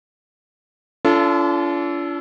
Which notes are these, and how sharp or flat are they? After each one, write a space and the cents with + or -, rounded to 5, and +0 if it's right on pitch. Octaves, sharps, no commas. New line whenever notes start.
D4 -45 F4 -35 A4 +0